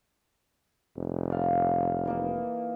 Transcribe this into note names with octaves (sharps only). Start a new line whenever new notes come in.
F1
D5 F5
E3 A#3 D#4